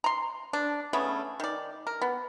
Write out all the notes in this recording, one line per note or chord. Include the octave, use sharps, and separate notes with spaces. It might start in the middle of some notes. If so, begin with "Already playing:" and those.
A#5 C6
D4
C#3 A3 B3 C#4
D#3 D5
A#4
B3